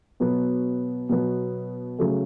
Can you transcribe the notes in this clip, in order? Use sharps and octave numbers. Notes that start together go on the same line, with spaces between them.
B2 F#3 B3
B2 F#3 B3
C#3 F#3 A3